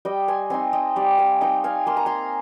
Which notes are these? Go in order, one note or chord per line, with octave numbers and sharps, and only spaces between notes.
G3 D#5 G5
G#5 C6
C4 D#4 G#5 C6
D#5 G5
G3 D5 F5
F5 G#5
C4 D#4 D#5 G5
F5 G#5
A#3 C6
A#5
G#5 C6